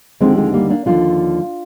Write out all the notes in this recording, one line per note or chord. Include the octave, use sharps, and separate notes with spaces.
D#2 D3 F3 G#3 C4
G#3 C4
G3 A#3
A#3 D4
D#2 D3 F3 D4 F4